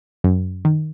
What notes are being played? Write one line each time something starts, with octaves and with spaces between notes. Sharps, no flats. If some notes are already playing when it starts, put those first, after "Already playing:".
F#2
D#3